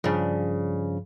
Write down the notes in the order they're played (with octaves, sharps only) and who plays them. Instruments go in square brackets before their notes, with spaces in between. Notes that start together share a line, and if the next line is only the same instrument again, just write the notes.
[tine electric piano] G2 F3 [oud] C#3 D4